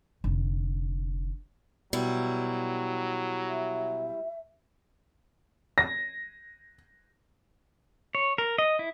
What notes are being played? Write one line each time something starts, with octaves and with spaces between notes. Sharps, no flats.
F1 D3
B2 F#3 G3 E4
E5
A#6
C#5
A#4
D#5
E4